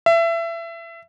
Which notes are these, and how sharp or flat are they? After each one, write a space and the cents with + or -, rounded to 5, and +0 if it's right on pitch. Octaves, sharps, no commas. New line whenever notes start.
E5 +25